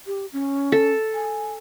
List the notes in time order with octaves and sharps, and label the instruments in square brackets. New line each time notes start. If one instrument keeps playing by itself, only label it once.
[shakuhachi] G4
C#4
[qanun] A4
[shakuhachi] G#5